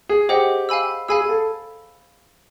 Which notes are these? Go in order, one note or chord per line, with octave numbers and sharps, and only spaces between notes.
G#4
G4 G#4 C5 D#5 F#5
F5 G#5 B5 E6
G#4 F5 G#5 B5 E6
G#4
A4